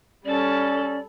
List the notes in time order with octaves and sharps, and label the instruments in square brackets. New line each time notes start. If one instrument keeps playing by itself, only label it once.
[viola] G3 A4 [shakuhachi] C#4 [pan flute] D5